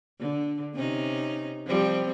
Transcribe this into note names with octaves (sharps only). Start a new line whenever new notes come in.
D3
C3 C#4 D#4
F3 G3 C4